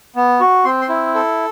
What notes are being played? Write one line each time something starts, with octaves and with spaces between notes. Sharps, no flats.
B3
F#4
C4 C6
C6
E4
A4